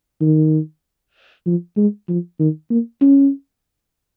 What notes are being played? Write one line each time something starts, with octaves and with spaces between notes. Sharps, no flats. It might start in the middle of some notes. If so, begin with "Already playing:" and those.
D#3
F3
G#3
F3
D#3
A#3
C#4